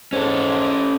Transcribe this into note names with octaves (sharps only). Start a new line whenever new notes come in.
G#2 C#4 A4